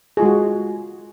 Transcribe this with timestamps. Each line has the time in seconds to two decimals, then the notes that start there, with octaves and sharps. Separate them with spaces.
0.17 G#4
0.20 F4
0.22 G#3
0.25 F#4